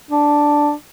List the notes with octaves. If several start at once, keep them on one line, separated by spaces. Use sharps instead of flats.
D4